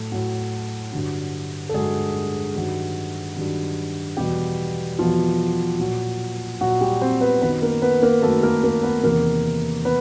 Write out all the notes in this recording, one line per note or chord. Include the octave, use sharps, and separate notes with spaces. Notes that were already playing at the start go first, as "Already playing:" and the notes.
Already playing: A2 F#3 A3
A2 F#3
G2 D3 F#3
A4
G2 D3 F#3 G#3 G#4
G2 D#3 F#3
G2 D#3 F#3
E2 B2 F#3 G3 G4
E2 B2 F3 F#3 F4
A#2 F#3
A#2 F#3 F#4
G3 G4
C4 C5
B3 B4
F#2 D#3 F#3 B3 B4
A#3 A#4
B3 B4
A#3 A#4
F#2 D#3 F#3 A3 A4
A#3 A#4
A#3 A#4
B3 B4
E2 C3 D#3 A#3 A#4
B3 B4